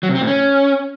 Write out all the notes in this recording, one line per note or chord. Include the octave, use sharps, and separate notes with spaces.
F#3
C3
C4
A2
C#4